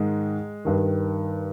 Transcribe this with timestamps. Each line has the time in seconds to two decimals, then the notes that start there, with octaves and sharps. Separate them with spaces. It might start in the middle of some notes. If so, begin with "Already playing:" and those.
Already playing: G#2 D#3 G#3
0.65 G2 D#3